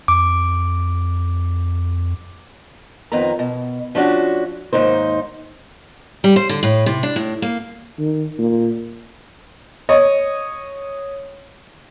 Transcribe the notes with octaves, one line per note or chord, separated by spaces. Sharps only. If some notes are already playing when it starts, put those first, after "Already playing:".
F2 D6
F2 D#3 B3 A#5
B2
F3 C#4 D4 F#4
D#2 G#2 D#4 C5
G3
C5
D3
A2
C3
D4
A2
A#3
D#3
A#2
C#5 D#5